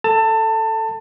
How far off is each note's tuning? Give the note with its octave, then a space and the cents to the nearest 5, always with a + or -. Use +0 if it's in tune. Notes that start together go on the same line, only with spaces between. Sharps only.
A4 +0 A5 +25